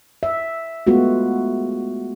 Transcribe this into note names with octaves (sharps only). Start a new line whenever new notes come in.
E5
G#3 A3 B3 F4 F#4